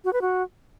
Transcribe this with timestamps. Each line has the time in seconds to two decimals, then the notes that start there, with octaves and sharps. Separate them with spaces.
0.05 F#4
0.13 B4
0.21 F#4